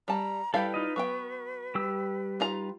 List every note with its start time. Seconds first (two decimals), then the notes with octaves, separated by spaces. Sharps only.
0.08 G3 A5 A#5
0.54 G3 E4 A4 B4 F5 G5
0.74 D#4 F4 D#5
0.96 F#3 B3 G5 C#6
1.75 G3 G4 E6
2.40 D#4 F4 A#5